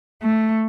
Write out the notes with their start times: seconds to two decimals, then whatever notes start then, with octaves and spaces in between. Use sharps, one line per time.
0.23 A3